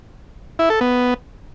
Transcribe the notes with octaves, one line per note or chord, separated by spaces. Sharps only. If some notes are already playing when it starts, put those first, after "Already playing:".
E4
A4
B3